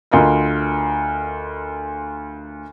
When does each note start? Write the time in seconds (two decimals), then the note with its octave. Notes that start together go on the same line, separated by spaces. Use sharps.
0.11 D2 F4 A#4 D#5